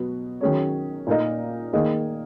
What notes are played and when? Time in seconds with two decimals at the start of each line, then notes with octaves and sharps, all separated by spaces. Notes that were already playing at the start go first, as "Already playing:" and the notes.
Already playing: B2 F#3 B3 F#4
0.41 D#3 F#3 C#4 G#4 C#5
1.07 A#2 A#3 D#4 A#4 D#5
1.73 D#3 A#3 D#4 G#4 D#5